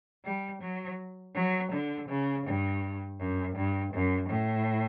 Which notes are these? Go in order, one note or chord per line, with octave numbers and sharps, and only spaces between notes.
G3
F#3
F#3
D3
C#3
G2
F#2
G2
F#2
A2